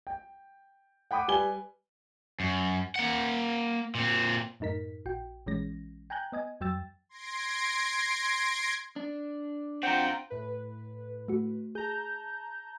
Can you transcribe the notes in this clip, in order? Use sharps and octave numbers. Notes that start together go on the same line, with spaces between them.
G5
F#5 G5 B5 D6 D#6
G3 B4 G#5 G7
F#2
A#3 F#5
A#2 C4
F#2 A2 D#4 A#4 B6
A#1 F#4 G5
A#1 E3 G#3 C#4 A#6
G5 G#5 A#5 F#6 G6
B3 D#5 G#5
F2 F#3 G5 E6 A6
C6 G#6 A#6 C7 D7
D4
C4 F4 F#5 G5 A#5 G6 C#7
A2 B4
A3 F#4
G#4 A5 A#5 G6